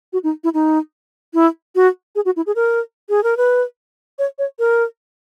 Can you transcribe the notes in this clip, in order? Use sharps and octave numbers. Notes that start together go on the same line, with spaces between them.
F#4
D#4
E4
D#4
E4
F#4
G#4
F#4
E4
G#4
A#4
G#4
A#4
B4
C#5
C#5
A#4